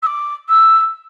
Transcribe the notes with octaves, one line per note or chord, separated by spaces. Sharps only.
E6
D6
E6